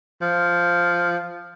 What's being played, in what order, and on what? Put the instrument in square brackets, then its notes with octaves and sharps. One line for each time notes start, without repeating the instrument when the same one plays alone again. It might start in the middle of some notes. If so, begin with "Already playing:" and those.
[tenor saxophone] F3